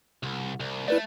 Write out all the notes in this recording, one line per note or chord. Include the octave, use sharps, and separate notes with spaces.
C2
C2
A3 E4 B4 D5